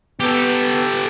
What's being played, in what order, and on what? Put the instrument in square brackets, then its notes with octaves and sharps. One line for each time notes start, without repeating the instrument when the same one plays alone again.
[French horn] B3 [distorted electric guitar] G4 A4